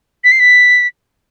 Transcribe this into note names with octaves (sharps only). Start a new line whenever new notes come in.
B6
C7
B6